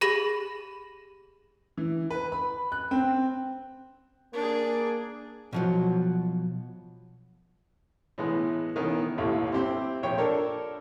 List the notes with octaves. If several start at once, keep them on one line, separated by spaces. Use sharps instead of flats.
G4 G#4 B5 A#6 F#7
E3
B4
B5
F#6
C4
A#3 D4 G#4
B2 F3 F#3
A2 E3 G#3 B3
D#3 E3 B3 C#4
A1 D#2 A3
C4 E4 G4 C5
A#1 C#5 G5
D4 A4 A#4 C#5